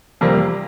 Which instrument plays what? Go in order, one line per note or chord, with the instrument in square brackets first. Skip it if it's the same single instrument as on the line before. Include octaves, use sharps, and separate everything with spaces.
[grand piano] F2 C3 G3 A#3